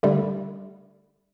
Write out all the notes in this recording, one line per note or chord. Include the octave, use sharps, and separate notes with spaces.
D3 G3 A3